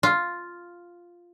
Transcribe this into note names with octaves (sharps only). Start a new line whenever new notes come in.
F4